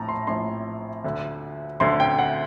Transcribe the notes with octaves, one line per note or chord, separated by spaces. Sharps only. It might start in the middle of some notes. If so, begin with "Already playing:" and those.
Already playing: A#1 A2 A5 A#5
C6
A#1 A2 C6
D2 D3
D2 D3 C6
G5
F#5